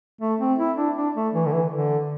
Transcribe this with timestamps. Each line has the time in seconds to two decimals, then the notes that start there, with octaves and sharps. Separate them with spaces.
0.21 A3
0.40 C4
0.59 E4
0.77 D4
0.96 D4
1.15 A3
1.34 E3
1.46 D3
1.53 E3
1.72 D3